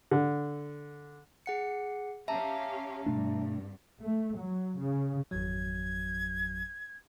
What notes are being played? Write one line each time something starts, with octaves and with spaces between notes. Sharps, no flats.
D3
G#4 F#5 C#7
C#4 G4 E5 F5 A5 A#5
C2 G2 B2 A3 D4
A3
F#3
C#3
G#1 F2 F#3 G#6